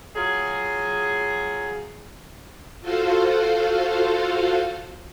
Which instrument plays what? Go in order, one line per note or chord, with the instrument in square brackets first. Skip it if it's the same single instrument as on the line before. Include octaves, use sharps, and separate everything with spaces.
[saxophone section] F#3 F4 G#4
[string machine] F4 F#4 A4 C5 F5